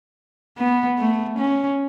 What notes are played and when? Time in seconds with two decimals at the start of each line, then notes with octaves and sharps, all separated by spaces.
0.58 B3
0.99 A3
1.39 C#4